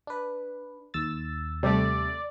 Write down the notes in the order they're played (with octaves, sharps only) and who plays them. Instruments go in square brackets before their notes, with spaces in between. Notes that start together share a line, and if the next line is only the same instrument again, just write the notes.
[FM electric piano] D4 B4
D#2 E6 A6
[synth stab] C3 G3 A3 [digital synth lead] D5